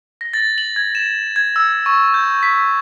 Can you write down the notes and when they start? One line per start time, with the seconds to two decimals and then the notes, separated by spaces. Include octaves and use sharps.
0.21 A#6
0.34 A6
0.58 F#7
0.76 G#6
0.95 E7
1.36 G#6
1.56 E6
1.86 C#6
2.14 G6
2.43 B6